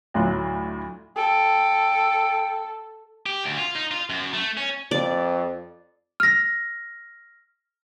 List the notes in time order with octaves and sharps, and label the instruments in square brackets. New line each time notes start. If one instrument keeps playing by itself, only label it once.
[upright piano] D2 A2 F#3 F4 C6 F#6
[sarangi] A4 [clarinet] G5
[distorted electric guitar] G4
D2
F4
D#4
F4
F#2
A3
C#4
[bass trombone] F2 [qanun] D5
[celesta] F6 A#6